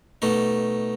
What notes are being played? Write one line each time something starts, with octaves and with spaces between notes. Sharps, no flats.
B2 A3 D#4